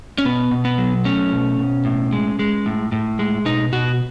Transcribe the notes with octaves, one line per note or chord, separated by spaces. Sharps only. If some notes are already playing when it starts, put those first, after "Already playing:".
C#4
B2 B3
B2
B3
F#3
A3 C#4
B2
B2
A2
G#3
G#3
A2
A2
G#3
B2 D#4
B2 F#4